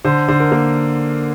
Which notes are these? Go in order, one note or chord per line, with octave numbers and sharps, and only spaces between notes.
D3 C5
D3 C5
A#4
A#3